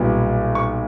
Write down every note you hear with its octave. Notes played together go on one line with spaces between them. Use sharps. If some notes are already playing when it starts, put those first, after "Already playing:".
Already playing: B1 A#2 G3 B3
C#6